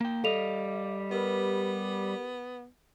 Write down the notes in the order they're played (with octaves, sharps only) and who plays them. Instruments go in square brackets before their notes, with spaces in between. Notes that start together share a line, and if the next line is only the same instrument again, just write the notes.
[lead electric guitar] A#3 G5
[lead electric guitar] G3 D#5 [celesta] A4 F7 [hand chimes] F5
[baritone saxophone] B3 [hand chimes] G4 A#4 B4